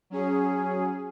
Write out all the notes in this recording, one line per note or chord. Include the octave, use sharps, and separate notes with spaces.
F#3 C#4 G#4